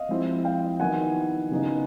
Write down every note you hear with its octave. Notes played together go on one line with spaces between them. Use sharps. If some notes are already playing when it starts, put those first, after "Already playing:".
Already playing: D#5 F5
F3 G#3 C4 E4
F5 G5
D#3 F#3 B3 E4 F#5 G#5
C#3 F#3 B3 D#4